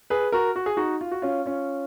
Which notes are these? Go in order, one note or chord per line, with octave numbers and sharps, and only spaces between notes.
G#4 B4
F#4 A#4
F#4
G#4
D#4 F#4
F4
F#4
C#4 F4
C#4 F4